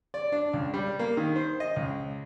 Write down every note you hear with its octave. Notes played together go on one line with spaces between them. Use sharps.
D5
D4
C#2
G3
A#3
D#3
C5
D#5
C#2